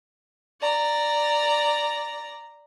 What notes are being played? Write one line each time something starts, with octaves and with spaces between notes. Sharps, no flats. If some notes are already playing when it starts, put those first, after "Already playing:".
D5 A#5